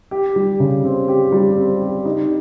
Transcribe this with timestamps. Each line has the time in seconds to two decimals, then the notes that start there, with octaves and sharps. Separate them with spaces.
0.11 G4
0.36 G3
0.60 C#3
0.85 C4
1.08 G4
1.32 G3
1.57 C4
1.81 G4
2.06 D#4